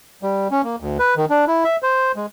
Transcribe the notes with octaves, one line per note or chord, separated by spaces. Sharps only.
G3
C#4
A#3
D2
B4
D#3
D4
E4
E5
C5
G#3